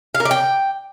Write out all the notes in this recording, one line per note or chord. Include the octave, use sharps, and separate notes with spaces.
F5
A#4
D5
G5